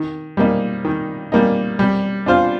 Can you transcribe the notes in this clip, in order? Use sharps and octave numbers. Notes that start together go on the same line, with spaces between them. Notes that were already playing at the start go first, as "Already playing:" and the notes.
Already playing: D#3
G3 A#3 D#4
D#3
G3 A#3 D#4
G3
D4 F4 C5 F5